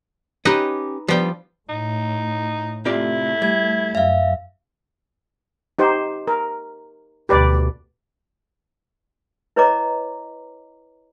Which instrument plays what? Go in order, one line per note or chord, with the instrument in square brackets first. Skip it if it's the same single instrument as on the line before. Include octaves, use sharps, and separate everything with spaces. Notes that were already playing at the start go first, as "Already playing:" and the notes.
[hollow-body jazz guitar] C#4 G4 [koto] D#4 B4 D#5
[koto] F3 G5 [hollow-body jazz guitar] G3 B3 D4
[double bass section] A2 [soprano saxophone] D#4
[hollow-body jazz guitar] C3 F4 D5 [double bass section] A3 [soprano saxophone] E4
[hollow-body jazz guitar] G3 [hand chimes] G#6
[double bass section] F#2 [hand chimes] E5 F5
[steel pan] D#4 G4 C5
A#4
[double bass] D2 B2 [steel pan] G4 B4 D5
[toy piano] E4 B4 C#5 D#5 A#5 D6